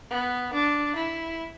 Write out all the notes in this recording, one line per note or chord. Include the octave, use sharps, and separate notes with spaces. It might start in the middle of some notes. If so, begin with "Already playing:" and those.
B3
D4
E4